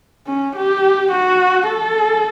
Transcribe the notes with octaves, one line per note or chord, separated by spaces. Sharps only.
C#4
G4
F#4
A4